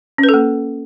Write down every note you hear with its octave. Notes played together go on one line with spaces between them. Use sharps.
C#4
B4
A4
A#3